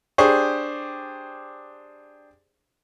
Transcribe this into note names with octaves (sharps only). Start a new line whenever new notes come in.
D4 G4 G#4 C5 C#6